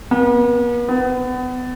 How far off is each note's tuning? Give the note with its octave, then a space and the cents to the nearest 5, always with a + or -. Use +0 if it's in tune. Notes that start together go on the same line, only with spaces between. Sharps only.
B3 -45
B3 +30